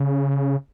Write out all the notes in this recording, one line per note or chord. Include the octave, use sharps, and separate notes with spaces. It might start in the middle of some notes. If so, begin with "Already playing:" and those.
Already playing: C#3